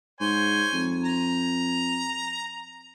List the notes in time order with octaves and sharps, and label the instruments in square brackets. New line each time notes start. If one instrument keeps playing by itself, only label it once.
[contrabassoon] G#2 [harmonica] C5 C#5 G#5
[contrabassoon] F2
[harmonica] A#5